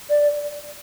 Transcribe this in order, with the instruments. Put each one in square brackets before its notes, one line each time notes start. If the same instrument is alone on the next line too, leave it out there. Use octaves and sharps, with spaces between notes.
[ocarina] D5